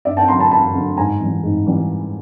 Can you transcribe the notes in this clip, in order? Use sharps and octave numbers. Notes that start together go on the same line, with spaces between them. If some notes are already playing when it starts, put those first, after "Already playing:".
G2 D5 E5
G5 A5
D3 F#3 A3 A#5 C6
A5 B5
G2 A5 B5
D3 F#3 A3
G#2 G#5 A#5
E3 G3
G#2
E3 G3